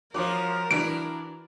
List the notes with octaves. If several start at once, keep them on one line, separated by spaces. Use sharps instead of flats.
F3 F4 F#4 A#4 C#5 D6
E3 D4 E4 F#4 D7